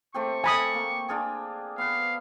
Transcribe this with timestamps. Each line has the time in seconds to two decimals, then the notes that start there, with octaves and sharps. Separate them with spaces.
0.14 A3 C4 G4 C#6
0.44 A4 G#5 B5 D#6
0.74 A#3
1.09 D4 F4 G#4
1.78 B3 B4 F5